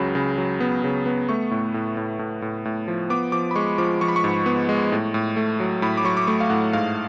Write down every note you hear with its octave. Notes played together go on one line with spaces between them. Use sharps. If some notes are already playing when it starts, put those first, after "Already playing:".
Already playing: C#2 C#3 F#3 B5
C#3
F#3
B3
C#3
B3
A3 C#6
A2
A2
A2
A2
A2
A2
F3
B3 D6
F3 D6
B5
G#3 C#6
F3 D6
F3 C#6
B5
C#6
G#2
B3
G#3
A2
A2
A3
F#3
A2 B5
D6
F#3 C#6
D6
A3 C#6
F5
A2 F#5
G#2 F5